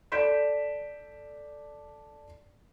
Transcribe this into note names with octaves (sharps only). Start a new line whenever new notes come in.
A4 D5 G6 B6 D7 E7